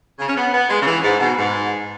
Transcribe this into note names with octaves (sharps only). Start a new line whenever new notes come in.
C#3
C#4
B3
B3
G#3
C#3
E3
G#2
B2
G#2